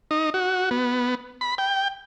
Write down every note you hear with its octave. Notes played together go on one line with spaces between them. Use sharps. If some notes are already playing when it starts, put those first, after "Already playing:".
D#4
F#4
B3
B5
G5